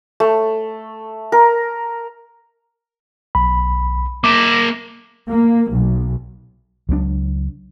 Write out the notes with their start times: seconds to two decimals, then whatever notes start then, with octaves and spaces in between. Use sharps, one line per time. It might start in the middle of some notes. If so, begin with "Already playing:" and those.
0.20 A3
1.32 A#4
3.35 B1 B5
4.24 A#3 E5 D6
5.29 A#3
5.72 B1
6.89 C#2 F#3 G3 D4